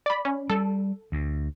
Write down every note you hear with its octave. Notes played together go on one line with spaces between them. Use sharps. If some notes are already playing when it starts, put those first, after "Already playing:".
D5 B5
C#4
G3 A4
D2